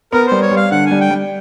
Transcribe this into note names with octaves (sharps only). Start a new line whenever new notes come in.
B3 A#4
G3 C5
C#5
G3
F5
D3 F#5
G#5
G3
G5
G3